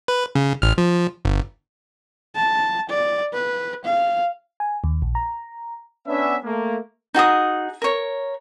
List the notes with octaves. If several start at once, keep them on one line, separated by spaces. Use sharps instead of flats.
B4
C#3
A1 F6
F3
G1
A5
D5
B4
F5
G#5
D#2
A#1
A#5
B3 C#4 D4 E5
A3 A#3
D#4 F#4 G#4 D#6
A#4 C#5